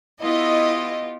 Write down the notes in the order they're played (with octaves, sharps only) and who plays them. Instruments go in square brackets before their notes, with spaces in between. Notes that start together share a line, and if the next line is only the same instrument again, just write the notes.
[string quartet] B3 F4 G4 [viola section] E4 [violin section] D#5